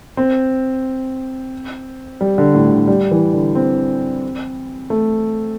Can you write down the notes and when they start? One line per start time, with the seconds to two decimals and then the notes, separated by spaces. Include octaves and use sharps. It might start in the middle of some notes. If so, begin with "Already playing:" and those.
0.17 C4
2.21 G3
2.38 D3
2.55 A2
2.72 D3
2.88 G3
3.11 E3
3.33 D3
3.55 C4
4.90 A3